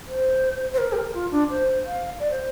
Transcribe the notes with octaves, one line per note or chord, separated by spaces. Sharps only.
C5
C5
A#4
G4
A#4
F4
D4
C5
F5
D5
C5